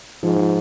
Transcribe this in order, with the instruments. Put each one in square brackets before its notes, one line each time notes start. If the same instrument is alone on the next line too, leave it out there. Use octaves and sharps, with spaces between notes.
[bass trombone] G#2 [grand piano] F3
[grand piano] F3